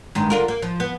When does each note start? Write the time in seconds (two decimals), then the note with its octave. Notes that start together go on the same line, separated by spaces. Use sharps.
0.15 G2 D#3 G#3
0.30 D3 F4 A#4
0.48 A#3
0.62 F3
0.80 B3